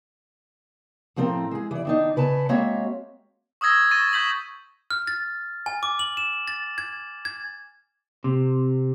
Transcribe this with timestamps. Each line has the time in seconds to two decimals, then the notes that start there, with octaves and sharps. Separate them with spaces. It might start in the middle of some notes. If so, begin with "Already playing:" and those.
1.16 A2 F3 C4 A4 A#4
1.51 G#3 G#4
1.71 E3 D5
1.85 D#3 D4 D#4
2.16 C#3 B4 G#5 A5
2.49 G#3 A#3 C4 F#4 C#5 E5
3.61 C#6 D#6 E6 G#6 A#6
3.91 C#6 A6 A#6 D#7
4.13 C#6 G6 B6 F#7
4.91 F6
5.07 A6
5.66 G#5
5.83 D6
5.99 F#7
6.17 E7
6.48 A6
6.78 G#6
7.25 G#6
8.24 C3